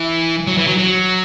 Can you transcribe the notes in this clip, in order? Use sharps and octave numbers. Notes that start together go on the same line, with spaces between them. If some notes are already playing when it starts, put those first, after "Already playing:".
Already playing: E3
F#3
E3
F#3
F#3